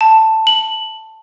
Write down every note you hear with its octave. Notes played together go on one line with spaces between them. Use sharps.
A5
F#7